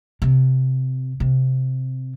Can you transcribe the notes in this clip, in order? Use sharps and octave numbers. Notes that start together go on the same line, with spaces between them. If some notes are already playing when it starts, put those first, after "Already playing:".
C3
C3